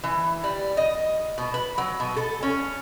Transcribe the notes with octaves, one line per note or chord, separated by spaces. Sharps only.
E3
G3
D#5
B2
B4
F#3
B2
A4
C#4